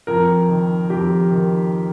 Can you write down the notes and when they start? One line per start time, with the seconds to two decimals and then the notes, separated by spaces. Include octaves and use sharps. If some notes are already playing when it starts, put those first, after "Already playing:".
0.07 F2 A#4
0.49 D#3
0.90 F2 G4
1.31 D#3